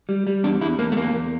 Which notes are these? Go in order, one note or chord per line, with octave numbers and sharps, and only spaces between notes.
G3
G3
E2 D4
E2 E4
E2 A#3
A3
E2 A#3
E2